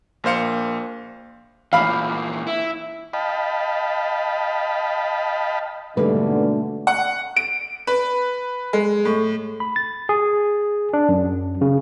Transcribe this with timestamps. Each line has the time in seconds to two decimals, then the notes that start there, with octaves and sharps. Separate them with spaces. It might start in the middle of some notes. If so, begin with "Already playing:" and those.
0.24 A#1 A#3 C5 F5 C#7
1.73 A#2 E3 F5 B5
2.47 E4
3.13 D#5 F5 G5 A5 B5
5.97 G#2 B2 D3 G3 A3 A#3 B4
6.87 F#5
7.37 D7
7.87 B4
8.73 G#3
9.05 A2
9.60 B5
9.76 A6
10.09 G#4
10.93 D4
11.09 F#2
11.61 C#3